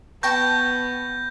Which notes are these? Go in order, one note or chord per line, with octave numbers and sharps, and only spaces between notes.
B3 G5 A5 C#6 G6 A#6